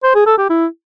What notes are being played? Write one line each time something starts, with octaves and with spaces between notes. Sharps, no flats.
C5
G#4
A4
G4
E4